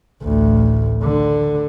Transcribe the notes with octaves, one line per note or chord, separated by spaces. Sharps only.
A1 D2
D3